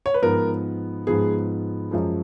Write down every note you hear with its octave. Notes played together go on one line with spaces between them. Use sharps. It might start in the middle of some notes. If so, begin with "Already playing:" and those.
C#5
B4
G#2 F3 B3 A#4
G#2 F3 B3 G#4
F#2 F3 G#3